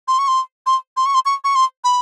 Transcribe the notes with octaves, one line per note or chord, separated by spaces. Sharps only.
C6
C#6
C6
C6
C6
C#6
C6
C#6
C#6
C6
B5